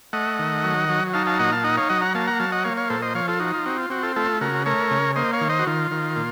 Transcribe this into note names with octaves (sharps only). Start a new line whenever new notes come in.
A3 D#5 F#5
D#3
F#3
F#3
D#4 F5 A5
F5 A5
A#2 D#5 F#5
F5 A5
D#4 D#5 F#5
C#5 F5
F#3 D#5 F#5
F#5 A#5
A#3 F5 A5
F#5 A#5
F#3 F5 A5
D#5 F#5
A#3 C#5 F5
C#5 F5
A#2 A4 C5
C5 D#5
F3 C#5 F5
F4 A4
D#4 F#4
F4
C4 F#4
F4
C4 F#4
F4 A4
A3 F4 A4
C#3 F#4 A#4
A3 A#4 C#5
C#3
A#3 C5 D#5
C#5 F5
D#3
C5 D#5
F#4
D#3 F4
D#3
A#2